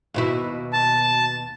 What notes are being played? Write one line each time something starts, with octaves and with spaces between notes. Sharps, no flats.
D#2 B2 E4
A5